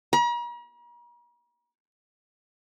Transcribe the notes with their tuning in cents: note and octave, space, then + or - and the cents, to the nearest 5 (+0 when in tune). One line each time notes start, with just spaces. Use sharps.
A#5 +45